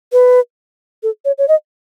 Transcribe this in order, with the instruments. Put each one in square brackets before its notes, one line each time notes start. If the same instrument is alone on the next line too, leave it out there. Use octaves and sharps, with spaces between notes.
[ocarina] B4
A4
C#5
C#5
D#5